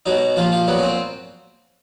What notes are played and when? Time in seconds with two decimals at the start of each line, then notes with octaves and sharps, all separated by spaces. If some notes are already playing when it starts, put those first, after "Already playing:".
0.06 B2 F#3 D#4
0.36 A#2 F3 F4
0.52 F4
0.67 A#2 F#3 B3
0.78 C#4
0.83 C4